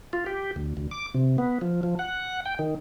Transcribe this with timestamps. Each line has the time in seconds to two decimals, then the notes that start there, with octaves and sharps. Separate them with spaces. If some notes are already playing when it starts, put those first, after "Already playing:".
0.13 F4
0.26 G4
0.56 D2
0.77 D2
0.91 D6
1.14 C3
1.38 B3
1.61 F3
1.83 F3
1.99 F#5
2.46 G5
2.59 D#3